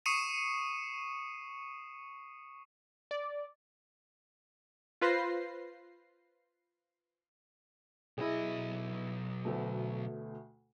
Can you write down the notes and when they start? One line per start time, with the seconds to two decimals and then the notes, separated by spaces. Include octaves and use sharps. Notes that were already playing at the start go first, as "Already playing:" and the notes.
0.06 C#6 D#6 C7 C#7 D#7 E7
3.11 D5
5.02 F4 B4 C5 A#6 C7
8.18 B1 E4 G#4 D#5
9.45 D2 B2 A3